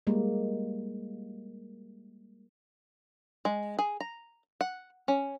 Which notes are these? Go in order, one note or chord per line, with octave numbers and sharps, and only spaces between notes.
G3 G#3 A#3
G#3
G#4
A#5
F#5
C#4